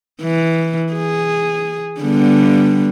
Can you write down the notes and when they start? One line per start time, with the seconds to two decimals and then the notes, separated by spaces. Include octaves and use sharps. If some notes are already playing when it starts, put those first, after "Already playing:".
0.22 E3
0.92 G#4
2.01 D3 G3 B3